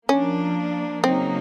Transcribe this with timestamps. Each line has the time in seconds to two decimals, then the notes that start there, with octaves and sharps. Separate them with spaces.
0.09 F3 A#3 C#4 D4
1.03 C#3 F#3 A#3 C4 D#4